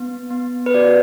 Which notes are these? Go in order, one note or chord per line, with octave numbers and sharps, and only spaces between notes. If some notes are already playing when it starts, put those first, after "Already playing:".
Already playing: B3
B3
B4
F#4 D5